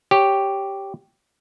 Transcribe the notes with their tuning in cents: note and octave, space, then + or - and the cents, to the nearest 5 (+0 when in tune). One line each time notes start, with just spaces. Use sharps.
G4 +0 C#5 +0